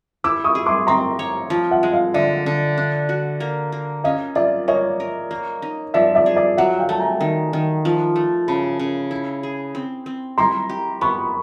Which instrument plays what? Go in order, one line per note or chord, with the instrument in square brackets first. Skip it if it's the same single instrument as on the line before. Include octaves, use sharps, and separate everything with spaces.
[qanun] E4 [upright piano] D6 E6
[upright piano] C#6 D#6
[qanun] G#4
[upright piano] C6 D6
[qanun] C4 [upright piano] A#5 C6
[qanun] C#5
F3
[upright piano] E5 F#5
[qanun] G#3
[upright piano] D#5 F5
[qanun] D3 [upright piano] D5 E5
[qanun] D3
D4
F#4
A#3
A#3
[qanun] C#4 [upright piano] D#5 F5
[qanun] F4 [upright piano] D5 E5
[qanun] A#3 [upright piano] C#5 D#5
[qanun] A#4
A#3
D#4
[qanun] F3 [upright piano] D5 E5
[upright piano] D5 E5
[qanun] G#4
[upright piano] D5 E5
[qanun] F#3 [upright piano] E5 F#5
[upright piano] F5 G5
[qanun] A3 [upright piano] A5
[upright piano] G#5 A#5
[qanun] D#3
D#3
F3
A3
[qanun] C#3 [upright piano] A5 B5
[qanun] C#3
E4
G#4
C4
C4
[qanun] E4 [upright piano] A#5 C6
[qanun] G4
[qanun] B3 [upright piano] B5 C#6